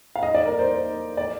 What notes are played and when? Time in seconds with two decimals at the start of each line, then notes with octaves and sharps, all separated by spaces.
0.16 F5
0.23 D#5
0.35 D5
0.46 A#4
0.59 C5
0.71 C5
1.17 D5